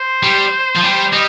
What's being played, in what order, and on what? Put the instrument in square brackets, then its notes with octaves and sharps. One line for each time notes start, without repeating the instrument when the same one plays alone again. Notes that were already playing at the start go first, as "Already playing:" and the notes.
Already playing: [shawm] C5
[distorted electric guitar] G3
F3
G3
[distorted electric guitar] G3 [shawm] D#5